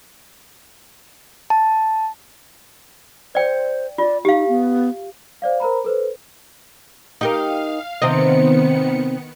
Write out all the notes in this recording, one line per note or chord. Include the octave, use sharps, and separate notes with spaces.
A5
C5 D5 G5
F4 D5
D#4 G4 F5
B3
C5 D5 F5
A#4 C5 A#5 B5
A4 B4 C5
D#4 G4 A#4 F5
C3 D#3 B3 C4 D#5 C#7